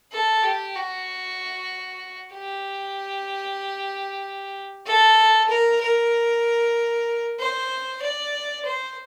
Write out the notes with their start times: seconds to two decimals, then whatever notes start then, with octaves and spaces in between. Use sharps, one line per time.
0.12 A4
0.44 G4
0.76 F#4
2.34 G4
4.86 A4
5.49 A#4
5.82 A#4
7.39 C5
8.02 D5
8.66 C5